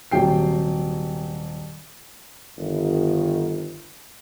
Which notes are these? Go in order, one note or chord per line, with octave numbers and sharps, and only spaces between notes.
D#1 C3 F#3 G5 C7
G1 D#3